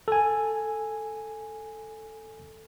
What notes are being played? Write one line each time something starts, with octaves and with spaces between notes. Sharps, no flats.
A4 G#5